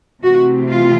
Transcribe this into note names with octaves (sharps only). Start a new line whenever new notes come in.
C3 E3 A3 C4 F#4
F4